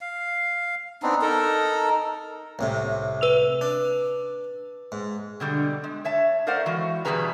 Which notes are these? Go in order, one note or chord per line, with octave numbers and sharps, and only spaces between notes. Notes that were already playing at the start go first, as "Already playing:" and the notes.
F5
B3 C4 D4 D#4
D#4 A4 A#4
C2 A2 C3
B4 E6 F7
D4
G#2
B2 D3 G3
G#3
C#5 E5 A5
A3 A#4 C5 D5 F5 F#5
E3 G#3 F#4
E2 B2 G3 G#4 B4 A#5